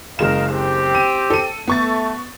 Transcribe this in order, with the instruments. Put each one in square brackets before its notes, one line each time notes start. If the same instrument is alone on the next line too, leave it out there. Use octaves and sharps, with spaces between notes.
[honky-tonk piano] F#1 G#3 E7 [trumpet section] A#4 D#5 F5
[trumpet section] C4 G4
[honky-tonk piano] D#7
A4 D#7
[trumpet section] A3 [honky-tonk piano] B3 C#6 A6